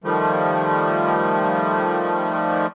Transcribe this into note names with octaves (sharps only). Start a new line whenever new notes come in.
D#3 F3 G3 A3